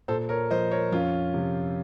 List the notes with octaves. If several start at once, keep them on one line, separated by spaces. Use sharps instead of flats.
A#2 A4 C5
A#4 C#5
F3 C5 D#5
A#4 C#5
F2 C#4 F4
C3 F3